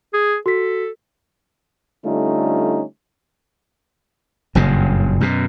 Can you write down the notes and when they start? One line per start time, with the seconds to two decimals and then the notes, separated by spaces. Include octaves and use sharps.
0.13 G#4
0.46 F#4 A4 B6
2.05 D3 G3 A3 C#4 D#4 F4
4.55 F#1 G2 A#2 C#3
5.21 F#2 B2